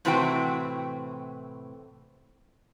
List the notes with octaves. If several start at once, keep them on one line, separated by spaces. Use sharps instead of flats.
A2 C3 E3 C4 F#4 G5